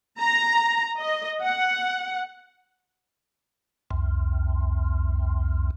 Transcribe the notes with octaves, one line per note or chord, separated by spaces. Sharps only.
A#5
D#5
F#5
C2 F2